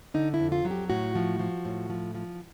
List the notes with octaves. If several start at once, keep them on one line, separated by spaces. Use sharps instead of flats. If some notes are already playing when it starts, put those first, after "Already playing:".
D3 D#4
E4
F2
F4
F#3
G4
A2 F#4
F3
F3
A2
F3
F3